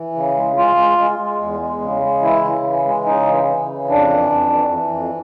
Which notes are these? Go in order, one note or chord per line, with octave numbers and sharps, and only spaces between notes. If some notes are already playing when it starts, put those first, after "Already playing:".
Already playing: E3
C#3
G#3
G#3 F4
G#3
G#3
G#3
E2
G#3
C#3
G#3
E3 E4
C#3
E3
G#3
C#3 D#4
E3
E3
C#3
F2 D4
E3
F2
E3
E3
F2